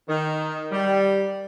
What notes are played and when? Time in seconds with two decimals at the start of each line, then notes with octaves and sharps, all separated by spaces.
0.09 D#3
0.71 G3